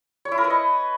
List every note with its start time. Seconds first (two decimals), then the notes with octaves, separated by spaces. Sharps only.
0.25 C#5
0.32 E4
0.38 A#4
0.44 B4
0.50 D#5